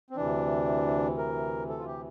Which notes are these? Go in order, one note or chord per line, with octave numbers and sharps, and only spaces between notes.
C4
D2 C3 E3 D4
A#4
A4
F4
G4